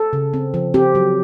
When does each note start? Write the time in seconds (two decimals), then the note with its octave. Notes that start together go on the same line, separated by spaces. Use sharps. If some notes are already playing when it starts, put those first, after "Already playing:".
Already playing: A4
0.13 C#3
0.34 C4
0.54 F3
0.74 C4 G4
0.95 F#3